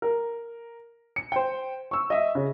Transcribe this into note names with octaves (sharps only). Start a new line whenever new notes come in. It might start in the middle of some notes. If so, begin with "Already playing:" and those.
A#4
C#7
C5 G5
C#6 E6
D#5 E5
C#3